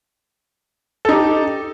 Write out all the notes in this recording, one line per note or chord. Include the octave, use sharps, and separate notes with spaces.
D#4 G4 A4